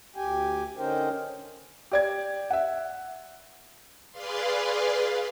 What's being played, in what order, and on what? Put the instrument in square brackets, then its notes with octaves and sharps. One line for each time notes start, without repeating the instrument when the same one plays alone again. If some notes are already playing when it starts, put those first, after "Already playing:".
[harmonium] D2 G4 G5 G#5
D3 C#4 D#4 A#4 C5 G5
[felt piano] G4 D5 G#6
E5 F#5
[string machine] G#4 B4 D5 F5 C6